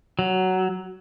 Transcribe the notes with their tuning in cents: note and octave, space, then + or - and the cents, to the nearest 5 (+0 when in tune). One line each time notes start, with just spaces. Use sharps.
F#3 +10